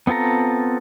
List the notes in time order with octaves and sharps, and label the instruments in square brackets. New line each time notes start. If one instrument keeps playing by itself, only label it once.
[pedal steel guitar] B3 C4 F4 A4 A#5